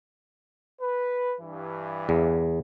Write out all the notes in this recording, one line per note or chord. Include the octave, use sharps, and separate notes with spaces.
B4
G2 E3
E2